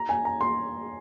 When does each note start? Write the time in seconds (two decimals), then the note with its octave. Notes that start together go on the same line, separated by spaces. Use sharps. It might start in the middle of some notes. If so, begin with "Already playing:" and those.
Already playing: A#5
0.09 G#5
0.25 A#5
0.41 C6